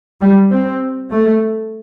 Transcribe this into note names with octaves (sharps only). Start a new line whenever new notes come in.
G3
C4
A3